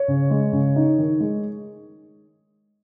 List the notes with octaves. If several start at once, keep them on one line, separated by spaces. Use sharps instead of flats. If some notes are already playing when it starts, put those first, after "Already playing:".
Already playing: C#5
C#3
G#3
C#3
D#4
D#3
G#3